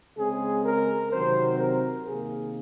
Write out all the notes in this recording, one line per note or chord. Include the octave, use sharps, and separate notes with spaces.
C#3 G#3 C4 G#4
A#4
C3 D#3 F#3 C4 C5
A#4
C3 D#3 A#3 G#4